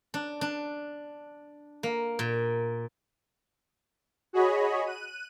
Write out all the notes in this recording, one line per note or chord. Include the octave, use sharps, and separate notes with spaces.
D4
D4
A#3
A#2
F#4 G#4 C#5 D#5 B5
F#6 D#7